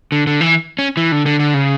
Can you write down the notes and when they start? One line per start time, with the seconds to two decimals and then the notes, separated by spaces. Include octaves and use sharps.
0.12 D3
0.27 D3
0.41 E3
0.79 C#4
0.97 E3
1.12 D3
1.26 D3
1.40 D3
1.54 C#3